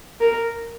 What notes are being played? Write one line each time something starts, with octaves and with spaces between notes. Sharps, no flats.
A#4